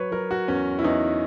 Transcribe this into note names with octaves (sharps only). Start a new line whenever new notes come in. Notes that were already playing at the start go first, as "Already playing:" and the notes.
Already playing: F#3 B4 C#5
F#3 A#4
F#4
E2 C#4
E4
E2 D#4